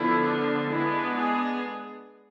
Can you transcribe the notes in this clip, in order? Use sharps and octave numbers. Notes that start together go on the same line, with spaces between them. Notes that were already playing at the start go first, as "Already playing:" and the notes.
Already playing: D3 F3 B3 E4
D4
G#3 B3 D4 E4
G#4